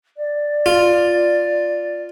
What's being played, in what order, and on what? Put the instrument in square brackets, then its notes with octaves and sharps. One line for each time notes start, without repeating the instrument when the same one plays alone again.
[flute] D5
[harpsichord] F4